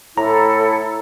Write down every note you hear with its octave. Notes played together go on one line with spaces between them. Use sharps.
A2 E4 A4 A#5